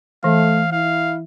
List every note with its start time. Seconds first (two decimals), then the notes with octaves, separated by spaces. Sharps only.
0.24 E3 A3 F5
0.72 E4 F5